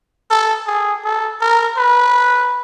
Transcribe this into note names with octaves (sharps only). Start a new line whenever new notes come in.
A4
G#4
A4
A#4
B4